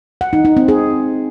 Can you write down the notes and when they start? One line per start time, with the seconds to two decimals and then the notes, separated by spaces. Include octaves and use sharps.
0.21 F#5
0.33 D#4
0.45 D#4
0.57 C4
0.68 G#4